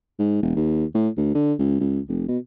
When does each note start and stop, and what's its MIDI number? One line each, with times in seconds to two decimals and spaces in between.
0.19 0.39 44
0.42 0.51 28
0.56 0.85 39
0.94 1.09 45
1.17 1.32 38
1.35 1.53 50
1.59 1.78 37
1.80 2.00 37
2.08 2.24 29
2.28 2.38 47